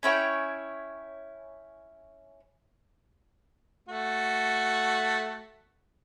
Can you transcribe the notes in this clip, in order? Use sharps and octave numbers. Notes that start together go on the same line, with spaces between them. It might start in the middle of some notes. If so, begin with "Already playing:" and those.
C#4 E4 C#5 G5
A3 F#4